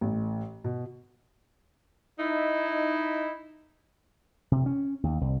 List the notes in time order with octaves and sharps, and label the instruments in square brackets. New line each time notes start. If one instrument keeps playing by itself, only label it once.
[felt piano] A1
B2
[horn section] D#4 E4
[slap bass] C3
C#4
D#2
C2